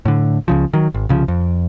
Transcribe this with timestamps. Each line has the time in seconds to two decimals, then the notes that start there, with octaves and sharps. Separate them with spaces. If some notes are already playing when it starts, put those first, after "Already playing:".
0.05 A2 D3
0.48 C#2 C#3 F3
0.73 D#3 F#3
0.94 G#1
1.09 C2 C#3 F3
1.28 F2